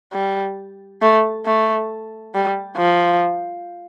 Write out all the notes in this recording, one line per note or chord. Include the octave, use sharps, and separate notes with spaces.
G3
A3
A3
G3
F3